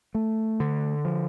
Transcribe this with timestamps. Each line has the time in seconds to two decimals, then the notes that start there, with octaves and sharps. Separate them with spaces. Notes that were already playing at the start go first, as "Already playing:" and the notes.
0.15 A3
0.60 D3
1.05 F3